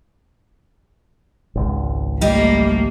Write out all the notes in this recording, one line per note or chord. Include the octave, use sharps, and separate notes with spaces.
G#1 C#2
G3 A3 A#3 G4 D#5